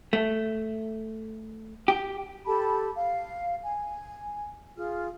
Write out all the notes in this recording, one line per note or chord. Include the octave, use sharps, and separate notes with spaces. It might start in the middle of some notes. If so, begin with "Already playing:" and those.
A3
G4
G4 A4 A5 B5
F5
G#5
F4 G#4 F6